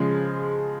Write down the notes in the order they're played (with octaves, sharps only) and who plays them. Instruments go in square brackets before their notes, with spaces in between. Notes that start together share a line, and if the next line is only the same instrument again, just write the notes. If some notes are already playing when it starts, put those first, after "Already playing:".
Already playing: [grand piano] C#3 F3 G#3